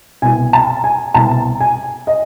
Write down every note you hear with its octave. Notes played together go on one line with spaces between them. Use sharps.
C2 B2 G#5
A5
G#5
C2 B2 A5
G#5
D#5